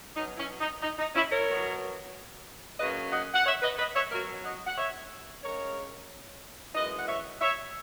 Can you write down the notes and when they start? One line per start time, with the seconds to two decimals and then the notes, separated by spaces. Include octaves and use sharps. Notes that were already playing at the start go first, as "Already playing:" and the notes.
0.16 B2 F#3 C#4 D#4
0.38 C#4 E4
0.60 D#4
0.82 D#4
0.98 D#4
1.15 C#4 E4
1.31 A#4 C#5
1.48 B2 F#3 B3
2.79 C#3 F#3 A#3 C#4 B4 D#5
3.13 D#5 F#5
3.34 F#5
3.46 C#5 E5
3.62 B4 D#5
3.78 B4 D#5
3.95 C#5 E5
4.11 B2 F#3 C#4 F#4 A#4
4.44 D#5 F#5
4.67 F#5
4.77 C#5 E5
5.43 C#3 G#3 C#4 A#4 C#5
6.75 F#2 E3 G#3 B4 D#5
6.98 F#5
7.08 C#5 E5
7.41 C#5 E5